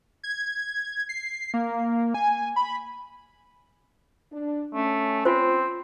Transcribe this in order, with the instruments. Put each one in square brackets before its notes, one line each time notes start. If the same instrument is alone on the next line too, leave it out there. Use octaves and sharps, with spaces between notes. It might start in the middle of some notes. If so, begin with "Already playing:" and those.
[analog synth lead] G#6
C7
A#3
G#5
B5
[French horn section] D4
[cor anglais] A3 [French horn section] C#4
[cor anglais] C4 [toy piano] F4 C5